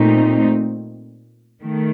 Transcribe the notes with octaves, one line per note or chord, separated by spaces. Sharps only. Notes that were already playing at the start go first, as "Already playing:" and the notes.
Already playing: A#2 A3 C4 D#4
D#3 A3